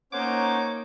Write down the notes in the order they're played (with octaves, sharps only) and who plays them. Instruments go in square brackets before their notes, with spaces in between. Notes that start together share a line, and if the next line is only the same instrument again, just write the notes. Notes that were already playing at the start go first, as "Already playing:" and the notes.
[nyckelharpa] A#3 D#4 [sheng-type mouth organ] C#4 C5 F#5 [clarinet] C#5 [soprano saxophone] D6